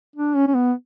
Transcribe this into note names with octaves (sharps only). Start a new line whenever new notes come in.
D4
C#4
C#4
B3